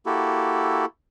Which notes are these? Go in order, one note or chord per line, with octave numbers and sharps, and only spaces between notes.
A#3 E4 F#4 G4 A4